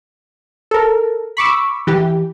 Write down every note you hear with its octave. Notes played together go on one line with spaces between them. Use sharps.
A4 A#4
B5 C#6 D6 E6
E3 G4